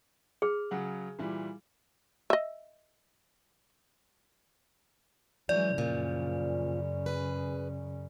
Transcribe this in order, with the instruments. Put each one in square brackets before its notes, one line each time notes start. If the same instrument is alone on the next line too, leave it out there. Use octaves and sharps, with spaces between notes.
[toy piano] G#4 [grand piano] F6
[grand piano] C#3 F#3 F#5
A#2 E3 G3
[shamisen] D#5 E5
[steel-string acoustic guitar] E3 C#4 [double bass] F#3 G#3 [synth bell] D5
[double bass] F#2 C#3 [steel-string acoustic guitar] A#2 F3
[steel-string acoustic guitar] G#4 B4